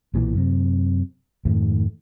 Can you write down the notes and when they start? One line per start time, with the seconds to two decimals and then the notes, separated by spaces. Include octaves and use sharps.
0.14 B1 A#2 E3
0.35 F#2 C3
1.45 F2 G#2 D#3 A3